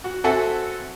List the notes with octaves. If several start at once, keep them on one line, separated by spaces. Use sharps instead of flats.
F#4
C4 F#4 A4 E5 F#5 G#5